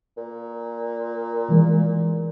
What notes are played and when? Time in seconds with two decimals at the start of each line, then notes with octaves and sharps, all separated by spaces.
0.17 A#2
1.48 B2 E3 G#3